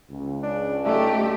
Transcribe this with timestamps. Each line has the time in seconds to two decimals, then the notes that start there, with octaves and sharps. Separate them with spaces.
0.10 C#2
0.43 D4
0.85 D3 A3 D#4 G4 A4 E5